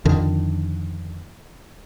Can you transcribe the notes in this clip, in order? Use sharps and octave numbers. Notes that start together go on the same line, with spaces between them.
F2 D3 D#3